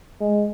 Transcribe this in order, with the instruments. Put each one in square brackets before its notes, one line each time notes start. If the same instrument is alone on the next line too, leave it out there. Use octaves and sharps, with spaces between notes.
[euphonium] G#3